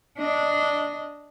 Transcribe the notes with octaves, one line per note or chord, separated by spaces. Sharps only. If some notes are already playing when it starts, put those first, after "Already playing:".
D4 D#5